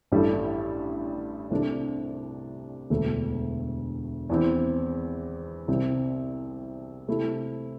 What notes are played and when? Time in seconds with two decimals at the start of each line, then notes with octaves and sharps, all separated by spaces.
0.12 A1 G2 G3 E4 A4
1.51 C2 C3 A3 D4
2.90 E1 D2 D3 A3
4.29 E2 E3 C4
5.68 C2 C3 G3 C4
7.08 C3 A3 E4